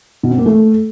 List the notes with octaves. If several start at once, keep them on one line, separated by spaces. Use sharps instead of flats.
B2
C4
A#3
A3